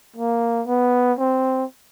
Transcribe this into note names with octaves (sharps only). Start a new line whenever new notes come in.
A#3
B3
C4